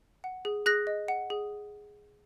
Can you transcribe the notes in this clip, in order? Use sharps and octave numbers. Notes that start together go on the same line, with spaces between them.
F#5
G#4
G#4 F#6 A#6
D#5
F#5
G#4